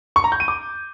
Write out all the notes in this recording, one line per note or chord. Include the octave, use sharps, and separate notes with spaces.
C#6
A#5
G6
D#7
D6